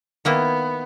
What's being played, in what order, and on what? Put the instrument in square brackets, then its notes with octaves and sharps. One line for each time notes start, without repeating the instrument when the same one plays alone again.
[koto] D#3 A#3 E4 [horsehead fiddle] B3